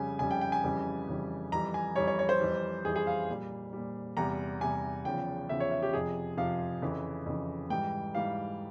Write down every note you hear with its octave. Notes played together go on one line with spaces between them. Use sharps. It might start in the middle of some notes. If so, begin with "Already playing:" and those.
Already playing: F2 C#3 G3 G#5
F2 C#3 G3 G#5
G5
G5
G#5
F2 C#3 E3 G3
F2 C#3 E3 G3
F2 E3 G3 A#5
G#5
F2 E3 G3 C#5
C#5
C#5
C5
F2 E3 G3
F2 E3 G3 G#4
G#4
F5
A#2 G3
A#2 G3
E2 C3 G3 A#5
E2 C3 G3 G#5
E2 C#3 F3 G5
E2 C#3 F3 E5
C#5
E5
G4
F2 C3 F3 G#4
F2 C3 F3 F5
F2 C#3 E3
F2 C#3 E3
G#2 E3 G3 G5
G#2 E3 G3 F5